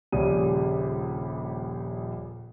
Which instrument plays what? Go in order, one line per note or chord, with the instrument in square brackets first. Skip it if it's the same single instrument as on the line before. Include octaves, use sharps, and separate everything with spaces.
[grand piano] D#1 A#1 C#3 G3 G#4 D#7